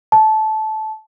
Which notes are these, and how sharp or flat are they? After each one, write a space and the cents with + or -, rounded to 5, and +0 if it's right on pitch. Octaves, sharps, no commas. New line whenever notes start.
A5 -15